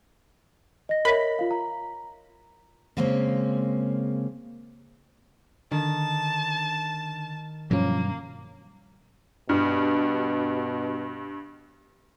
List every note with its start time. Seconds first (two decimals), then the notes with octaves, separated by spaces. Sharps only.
0.89 D#5 A#6
1.05 A#4 C#5 E5 B5
1.39 F4 F5
1.51 A#5
2.97 C#3 G#3 A#3 C4 C#4
5.72 D3 D#3 A5
7.71 G2 B2 F3 F#3 A#3 C#4
9.49 G2 B2